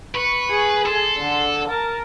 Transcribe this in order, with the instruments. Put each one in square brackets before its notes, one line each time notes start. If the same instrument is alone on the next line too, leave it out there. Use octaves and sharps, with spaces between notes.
[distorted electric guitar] B4 [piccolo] C#6
[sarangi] G#4
[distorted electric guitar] A4 [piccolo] C6
[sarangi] D3
[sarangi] A#4 [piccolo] A5